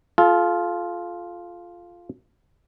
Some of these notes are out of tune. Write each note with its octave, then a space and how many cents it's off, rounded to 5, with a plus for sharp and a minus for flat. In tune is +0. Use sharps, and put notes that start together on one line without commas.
F4 +0 A4 -35